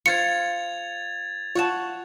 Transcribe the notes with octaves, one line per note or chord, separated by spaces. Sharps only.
F4 C5 G#6 A6 C#7 F7
F4 C#5 F#5 A5